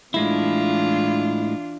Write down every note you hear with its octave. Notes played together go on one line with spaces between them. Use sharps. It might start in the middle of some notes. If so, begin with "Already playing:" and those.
A2 E3 G#3 D4 E4 F4